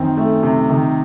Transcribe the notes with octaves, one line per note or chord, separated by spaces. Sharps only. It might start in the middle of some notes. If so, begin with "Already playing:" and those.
Already playing: F#2 D#3 C4
A3
C3
D#3